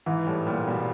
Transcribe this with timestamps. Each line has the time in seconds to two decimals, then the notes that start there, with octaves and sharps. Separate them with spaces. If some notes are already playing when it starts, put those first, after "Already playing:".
0.06 G#2 E3
0.26 A2 G3
0.47 A#2 G3
0.67 B2 G3